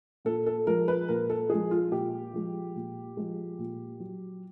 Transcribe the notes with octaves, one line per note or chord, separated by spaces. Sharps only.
A#2 A4
A4
F3 G#3 A#4
B4
A#2 A#4
A4
F3 G#3 G#4
F4
A#2 G4
F3 G#3
A#2
F3 G#3
A#2
F#3